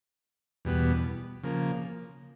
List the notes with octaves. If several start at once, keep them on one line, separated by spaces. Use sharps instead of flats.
E2 B2 G3 B3
C#3 F3 A#3